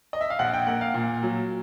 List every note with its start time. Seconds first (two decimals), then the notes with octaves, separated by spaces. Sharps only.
0.13 D#5
0.21 E5
0.30 F5
0.39 A#1 F#5
0.53 G5
0.67 A#3 F#5
0.81 F5
0.94 A#2
1.23 F#3